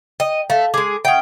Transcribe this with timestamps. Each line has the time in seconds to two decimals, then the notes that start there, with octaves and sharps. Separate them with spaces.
0.20 D#5 G5
0.50 A3 D#5 F5
0.74 G#3 G#4 D6
1.05 C#4 E5 F#5 G5 D#6